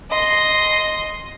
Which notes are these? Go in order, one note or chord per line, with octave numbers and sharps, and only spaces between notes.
D#5 C6